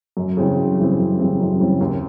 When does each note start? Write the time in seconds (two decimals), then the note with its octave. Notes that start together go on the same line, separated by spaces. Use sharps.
0.17 F#2
0.37 C#3 E3 G3 C4
0.57 F#2
0.79 C#3 E3 G3 C4
0.98 F#2
1.19 C#3 E3 G3 C4
1.40 F#2
1.60 C#3 E3 G3 C4
1.81 D#2